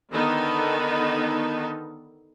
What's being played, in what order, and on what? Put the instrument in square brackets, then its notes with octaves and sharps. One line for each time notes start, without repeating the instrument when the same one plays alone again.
[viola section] D3 D#3 B3 D#4 A4